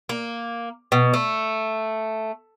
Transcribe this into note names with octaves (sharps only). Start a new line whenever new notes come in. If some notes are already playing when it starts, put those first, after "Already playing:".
A#3
B2
A3